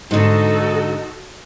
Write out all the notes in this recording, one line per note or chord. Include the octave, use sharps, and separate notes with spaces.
G#2 D3 D#4 F#4 A4